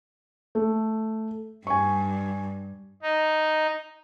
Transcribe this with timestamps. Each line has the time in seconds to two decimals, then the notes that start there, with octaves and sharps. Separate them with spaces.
0.55 A3
1.67 G2 G#5 C#6
3.02 D#4